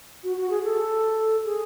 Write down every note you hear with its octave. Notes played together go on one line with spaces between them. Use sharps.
F#4
F#4
G#4
A4
G#4